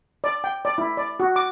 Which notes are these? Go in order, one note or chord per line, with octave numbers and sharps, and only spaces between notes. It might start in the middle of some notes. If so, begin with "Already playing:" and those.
D5
G5
D5
E4
D5
F#4
D6